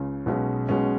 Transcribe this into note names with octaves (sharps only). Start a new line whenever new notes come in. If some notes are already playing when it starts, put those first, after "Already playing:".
Already playing: C#2 C#3
B1 B2 G#3 C#4
B1 B2 G#3 C#4